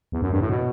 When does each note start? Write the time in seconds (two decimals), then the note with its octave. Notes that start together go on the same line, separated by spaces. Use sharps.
0.12 E2
0.22 F#2
0.32 G2
0.41 A2
0.50 B2